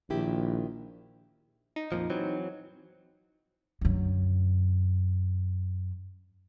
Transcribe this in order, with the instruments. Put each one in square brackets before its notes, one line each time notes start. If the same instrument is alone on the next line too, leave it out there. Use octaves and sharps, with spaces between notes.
[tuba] A#1 [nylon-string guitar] D#3 E4 G4
[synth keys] D#4
[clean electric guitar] F2 A#2 F3
E3 F#3 C4
[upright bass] F#2 D3